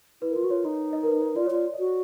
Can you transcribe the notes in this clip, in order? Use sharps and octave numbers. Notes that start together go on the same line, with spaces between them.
E4 B4
A#4
F4 B4
F#4
F4 C#5
D#4 D#5
D#5
A#4
B4
C5
F4 D5
C#5
F4 D5
D#5
F#4